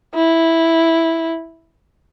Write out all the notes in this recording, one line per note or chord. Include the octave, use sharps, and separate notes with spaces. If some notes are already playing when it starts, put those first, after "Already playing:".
E4